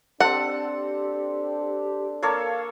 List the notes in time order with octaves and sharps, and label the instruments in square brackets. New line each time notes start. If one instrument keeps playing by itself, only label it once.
[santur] C4 A4 [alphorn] D4 [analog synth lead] G4 [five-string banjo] F#5
[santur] A#3 A4 C#5 [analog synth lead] F5